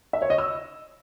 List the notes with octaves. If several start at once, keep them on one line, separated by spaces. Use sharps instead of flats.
E5
C#5
D#5
E6